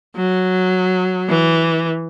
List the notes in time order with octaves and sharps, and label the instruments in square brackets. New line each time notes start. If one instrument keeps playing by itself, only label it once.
[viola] F#3
E3